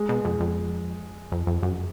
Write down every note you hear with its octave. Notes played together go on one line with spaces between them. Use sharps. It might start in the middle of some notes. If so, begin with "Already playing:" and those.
Already playing: G#3
B2
F2
F2
F2
F2
F#2